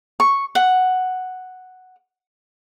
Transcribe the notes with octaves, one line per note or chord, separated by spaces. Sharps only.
C#6
F#5